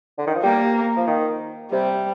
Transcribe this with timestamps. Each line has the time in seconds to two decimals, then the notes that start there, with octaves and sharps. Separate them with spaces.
0.18 D3
0.27 D#3
0.35 F3
0.43 G3 A#3
0.97 F3
1.07 D#3
1.71 C3 G3